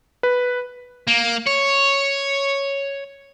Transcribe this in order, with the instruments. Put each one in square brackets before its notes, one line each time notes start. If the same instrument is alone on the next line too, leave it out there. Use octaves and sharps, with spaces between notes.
[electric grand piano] B4
[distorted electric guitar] A#3
C#5